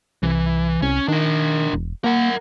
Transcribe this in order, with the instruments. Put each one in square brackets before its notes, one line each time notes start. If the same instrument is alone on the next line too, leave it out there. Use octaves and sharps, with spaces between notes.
[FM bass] C2 [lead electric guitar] E3
[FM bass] C2 [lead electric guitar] C#4
[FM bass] D#3 [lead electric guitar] D4 A#4
[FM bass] E1
[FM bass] A#3 [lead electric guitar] A#4 F#5